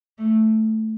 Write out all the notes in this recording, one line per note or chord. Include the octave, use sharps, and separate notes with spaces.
A3